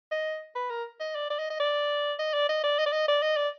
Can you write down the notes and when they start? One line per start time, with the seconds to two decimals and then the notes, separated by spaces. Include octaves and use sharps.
0.12 D#5
0.56 B4
0.70 A#4
1.00 D#5
1.15 D5
1.30 D5
1.39 D#5
1.50 D#5
1.60 D5
2.19 D#5
2.34 D5
2.49 D#5
2.64 D5
2.79 D#5
2.86 D5
2.93 D#5
3.08 D5
3.23 D#5
3.37 D5